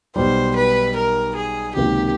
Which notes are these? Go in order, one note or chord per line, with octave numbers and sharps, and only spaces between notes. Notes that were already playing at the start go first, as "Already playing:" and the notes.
B1 B2 G3 C5
B4
A#4
G#4
C#2 C3 D#3 F#3 A#3 G4